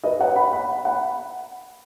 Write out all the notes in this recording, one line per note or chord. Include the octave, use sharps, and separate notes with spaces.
B4 D#5
C#5 F#5
F#5 B5
F#5 B5
F#5 B5